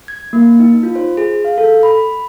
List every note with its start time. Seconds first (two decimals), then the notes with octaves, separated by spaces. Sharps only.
0.08 G#6
0.33 A#3
0.59 D#4
0.83 F4
0.95 C5
1.17 G#4
1.45 F5
1.58 A4
1.83 B5